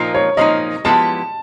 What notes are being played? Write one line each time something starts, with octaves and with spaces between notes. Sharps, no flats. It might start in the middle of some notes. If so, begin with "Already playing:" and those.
Already playing: A#2 F3 A#3 D#4
C#5
A#2 F3 A#3 D#4 D#5
F3 G#3 B3 E4 G4 A5